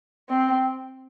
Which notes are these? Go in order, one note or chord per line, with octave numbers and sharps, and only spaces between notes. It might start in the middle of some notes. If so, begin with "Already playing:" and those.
C4